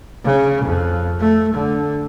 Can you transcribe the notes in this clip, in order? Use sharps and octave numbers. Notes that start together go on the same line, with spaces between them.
C#3
F2
A3
D3